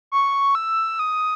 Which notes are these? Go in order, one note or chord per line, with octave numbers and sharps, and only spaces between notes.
C#6
E6
D#6